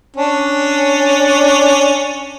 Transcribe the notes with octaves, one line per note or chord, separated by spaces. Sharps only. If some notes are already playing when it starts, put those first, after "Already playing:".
C#4 D4